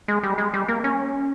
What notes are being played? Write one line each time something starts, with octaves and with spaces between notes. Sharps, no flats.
G#3
G3
G#3
G3
A#3
C#4